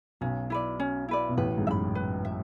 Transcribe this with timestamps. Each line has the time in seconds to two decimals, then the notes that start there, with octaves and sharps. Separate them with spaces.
0.21 B1 B2 C#4
0.50 E4 B4 D5
0.80 C#4
1.09 E4 B4 D5
1.29 B2
1.37 A1 A2 B4
1.58 G#2
1.67 F#2 E5 B5
1.95 B4
2.25 E5